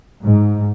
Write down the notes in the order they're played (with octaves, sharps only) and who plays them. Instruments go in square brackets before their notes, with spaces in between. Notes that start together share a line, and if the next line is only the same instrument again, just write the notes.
[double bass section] G#2